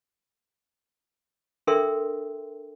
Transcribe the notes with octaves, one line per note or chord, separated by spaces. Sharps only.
D4 A4 A#4 E5 G5 C6